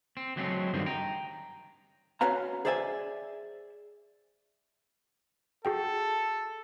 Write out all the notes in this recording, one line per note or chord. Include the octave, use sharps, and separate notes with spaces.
C4
F#3 G#3 A3 C4
G2 D3 D#3 C4
G5 A#5
C#4 F#4 B4 F5 A#5
G#4 C5 D5 E5 G5 G#5
F#4 G#4 A4 G5